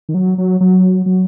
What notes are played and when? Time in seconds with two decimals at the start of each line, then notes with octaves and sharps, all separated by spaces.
0.09 D#3
0.14 F#3
0.38 F#3
0.61 F#3
1.06 F#3